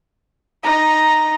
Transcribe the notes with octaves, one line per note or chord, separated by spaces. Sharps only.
D#4 A#5